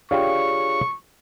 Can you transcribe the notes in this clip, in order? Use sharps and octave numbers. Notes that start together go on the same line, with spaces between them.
D4 F4 G4 G#4 C#5 F5 C#6